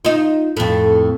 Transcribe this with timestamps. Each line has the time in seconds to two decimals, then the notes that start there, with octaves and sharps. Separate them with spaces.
0.05 D#4 F4
0.57 F2 A2